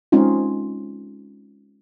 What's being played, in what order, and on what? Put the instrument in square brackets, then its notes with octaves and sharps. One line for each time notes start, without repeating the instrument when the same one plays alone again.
[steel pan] G#3 C4 C#4 D#4 F4